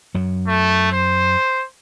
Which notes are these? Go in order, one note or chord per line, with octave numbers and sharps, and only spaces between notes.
F#2 F#3
A3
C5